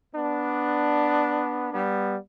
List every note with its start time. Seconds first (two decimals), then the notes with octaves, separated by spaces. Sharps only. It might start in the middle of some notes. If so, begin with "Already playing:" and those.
0.14 B3 D4
1.73 G3 B3